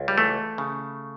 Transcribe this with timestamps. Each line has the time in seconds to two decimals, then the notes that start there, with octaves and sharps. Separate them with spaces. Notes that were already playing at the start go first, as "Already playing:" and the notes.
Already playing: C#2
0.08 G3
0.17 E3 A3
0.58 C#3